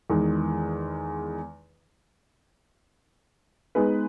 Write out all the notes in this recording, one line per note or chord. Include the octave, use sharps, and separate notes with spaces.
E2 D#3 G#3 D#4
G#3 B3 D#4 G#4 B4